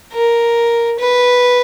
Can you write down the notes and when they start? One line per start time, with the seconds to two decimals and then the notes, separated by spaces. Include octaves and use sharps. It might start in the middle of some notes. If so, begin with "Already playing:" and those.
0.13 A#4
0.99 B4